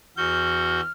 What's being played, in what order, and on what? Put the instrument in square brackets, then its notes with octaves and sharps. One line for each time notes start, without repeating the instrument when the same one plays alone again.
[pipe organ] E2 F#4 G6 [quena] F6